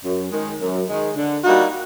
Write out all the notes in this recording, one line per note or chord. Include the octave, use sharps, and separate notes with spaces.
F#2
D#3 G#3
F#2
D#3 G#3
D3
G3 A#3 D#4 F#4